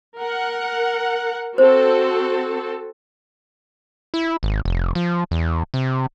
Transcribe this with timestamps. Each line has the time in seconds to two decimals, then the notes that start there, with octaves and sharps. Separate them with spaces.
0.19 A#4 F#5
1.58 C4 F#4 A4 C5
4.14 E4
4.43 G#1
4.65 F1
4.95 F3
5.31 E2
5.74 C3